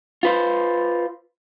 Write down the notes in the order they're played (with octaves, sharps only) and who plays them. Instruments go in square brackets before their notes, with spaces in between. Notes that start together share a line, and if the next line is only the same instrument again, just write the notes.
[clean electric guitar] F4 B4 C5